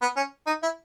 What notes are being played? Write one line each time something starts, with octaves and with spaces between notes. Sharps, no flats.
B3
C#4
D#4
E4